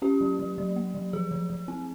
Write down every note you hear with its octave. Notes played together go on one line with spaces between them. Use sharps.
C#4 G4
F#3
F#3
F#3
A#3
F#3
F3 G#4
F3
F3
C4